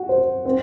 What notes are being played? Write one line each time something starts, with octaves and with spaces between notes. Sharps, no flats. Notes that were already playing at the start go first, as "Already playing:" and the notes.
Already playing: F#4
C5
C4